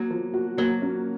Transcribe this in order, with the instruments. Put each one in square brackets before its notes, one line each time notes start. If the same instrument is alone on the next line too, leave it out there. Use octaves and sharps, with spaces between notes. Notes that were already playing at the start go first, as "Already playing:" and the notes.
Already playing: [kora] F#3 [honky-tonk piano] A#3
[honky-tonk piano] F3
F#4
[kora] F#3 [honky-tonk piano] A#3
[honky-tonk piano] C#4